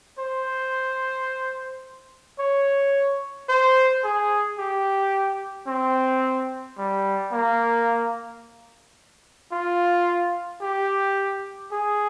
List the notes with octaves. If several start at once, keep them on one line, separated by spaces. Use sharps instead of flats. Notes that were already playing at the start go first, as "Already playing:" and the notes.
C5
C#5
C5
G#4
G4
C4
G3
A#3
F4
G4
G#4